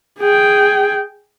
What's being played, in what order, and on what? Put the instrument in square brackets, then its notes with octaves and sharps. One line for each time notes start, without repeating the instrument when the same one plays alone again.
[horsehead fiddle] G#4 G5